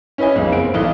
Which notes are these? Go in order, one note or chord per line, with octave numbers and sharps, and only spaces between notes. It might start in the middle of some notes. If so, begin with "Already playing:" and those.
C#4 E4 B4 D#5 G#5
B1 F2 G#3
F#1 B3 C4 D7
B1 E3 A4 D#5